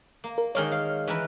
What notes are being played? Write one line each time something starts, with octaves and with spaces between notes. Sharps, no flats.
A#3
A#4
D#3 G#3 A#3 C#5 F6
F5
E3 A#4 B4